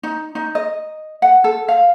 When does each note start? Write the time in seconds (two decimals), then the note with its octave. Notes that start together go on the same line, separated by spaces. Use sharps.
0.03 D#4
0.35 D#4
0.55 D#5
1.22 F#5
1.44 A4
1.68 F5